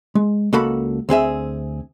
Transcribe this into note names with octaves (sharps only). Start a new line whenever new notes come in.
G#3
C#2 A#3 F#4 A4 B5
D2 C4 G#4 E5